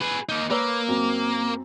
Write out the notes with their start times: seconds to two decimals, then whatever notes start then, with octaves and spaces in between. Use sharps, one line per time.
0.02 G#4 B4
0.29 A#3 D#4
0.50 A#3 B4 C#5 E6
0.88 F#2 C4